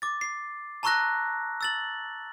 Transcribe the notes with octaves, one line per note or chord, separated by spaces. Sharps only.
D6 A6
C7
A5 A#5 C#6 E6 F#6 A#6
E6 A6 F#7